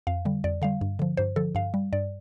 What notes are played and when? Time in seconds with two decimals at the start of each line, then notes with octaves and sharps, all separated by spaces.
0.07 F2 F5
0.25 D3 G3
0.44 F2 D5
0.62 D3 G3 F5
0.81 G2
0.99 D3 F3
1.17 G2 C5
1.36 D3 F3 A4
1.55 G2 F5
1.74 G3
1.93 G2 D5